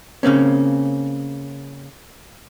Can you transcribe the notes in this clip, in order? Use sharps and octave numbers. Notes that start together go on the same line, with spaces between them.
C#3 A#3 C4 C#4